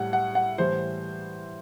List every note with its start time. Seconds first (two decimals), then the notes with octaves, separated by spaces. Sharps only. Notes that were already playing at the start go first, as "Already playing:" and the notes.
Already playing: A2 G3 F#5
0.13 F#5
0.35 F#5
0.58 A2 E3 G3 C5